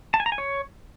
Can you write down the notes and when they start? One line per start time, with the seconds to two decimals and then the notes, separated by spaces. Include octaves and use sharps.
0.14 A5
0.20 G#5
0.26 A#5
0.32 G#5
0.38 C#5